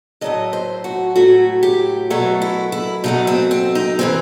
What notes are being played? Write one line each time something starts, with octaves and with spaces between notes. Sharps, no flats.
A2 F#3 A3 D#5
C5
F#4
A2 F#3 A3 F#4
G4
B2 F#3 A3 F#4
E4
E4
B2 F#3 A3 D#4
C4
C4
D#4
C3 E3 C4